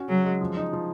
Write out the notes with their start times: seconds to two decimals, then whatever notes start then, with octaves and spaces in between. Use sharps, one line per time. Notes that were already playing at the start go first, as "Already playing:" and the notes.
Already playing: C#4 F#4
0.08 C#3 F#3
0.24 G#3
0.41 F3
0.57 D#4
0.73 F3